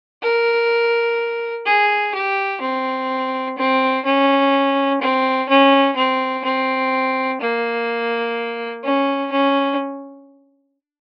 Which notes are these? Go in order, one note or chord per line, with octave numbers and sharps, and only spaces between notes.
A#4
G#4
G4
C4
C4
C#4
C4
C#4
C4
C4
A#3
C#4
C#4